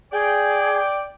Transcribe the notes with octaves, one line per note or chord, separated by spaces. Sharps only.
G#4 D5 G5